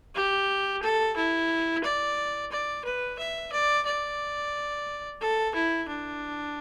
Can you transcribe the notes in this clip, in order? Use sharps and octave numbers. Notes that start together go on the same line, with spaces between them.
G4
A4
E4
D5
D5
B4
E5
D5
D5
A4
E4
D4